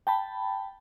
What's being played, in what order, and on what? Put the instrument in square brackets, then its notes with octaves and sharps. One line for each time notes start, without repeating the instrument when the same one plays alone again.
[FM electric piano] G5 A5 B5